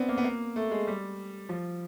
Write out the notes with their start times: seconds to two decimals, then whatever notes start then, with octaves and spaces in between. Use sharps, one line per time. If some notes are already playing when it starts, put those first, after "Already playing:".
Already playing: B3 C4 D4
0.09 A#3
0.18 B3
0.24 A#3
0.56 A3
0.71 G#3
0.87 G3
1.49 F3